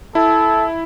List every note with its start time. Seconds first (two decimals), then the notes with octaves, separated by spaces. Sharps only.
0.15 E4 A4